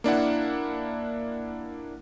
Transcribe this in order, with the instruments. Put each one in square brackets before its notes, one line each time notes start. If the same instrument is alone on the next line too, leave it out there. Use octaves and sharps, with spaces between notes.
[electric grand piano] A#3 D4 E4 F#5